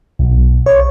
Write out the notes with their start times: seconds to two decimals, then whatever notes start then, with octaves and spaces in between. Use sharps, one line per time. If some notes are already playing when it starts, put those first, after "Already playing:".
0.19 B1
0.66 C#5